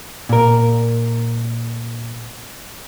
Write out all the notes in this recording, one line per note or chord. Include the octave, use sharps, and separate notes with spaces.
A#2 A#4